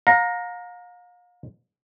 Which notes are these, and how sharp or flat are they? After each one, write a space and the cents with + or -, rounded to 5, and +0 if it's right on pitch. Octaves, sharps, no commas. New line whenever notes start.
F5 +35 A#5 +0